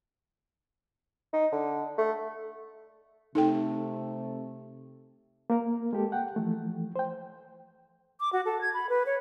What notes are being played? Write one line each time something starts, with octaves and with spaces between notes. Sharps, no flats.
D#4
D3
A3
C3 A3 D#4 A4 G5
A#3 A#4
G#3 A#3 G4 A4
F#5 G5
E3 F3 A3
C5 G5
D6
F#4
A4
G#6
B5
B4
C#5